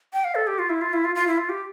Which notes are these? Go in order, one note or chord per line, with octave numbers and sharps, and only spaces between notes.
G5
F5
A4
G4
F4
E4
F4
E4
F4
F4
E4
F4
G4